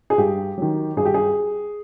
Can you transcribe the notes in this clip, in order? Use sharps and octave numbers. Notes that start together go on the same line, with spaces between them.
G#4
G2 G4
D#3 F#3
G2 G#4
G4
G#4